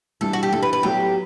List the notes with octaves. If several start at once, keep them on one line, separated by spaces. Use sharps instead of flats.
G2 E3 G3 A4
F#4
G4
G2 E3 G3 A4
B4
B4
A2 F#3 B3 F#4 G4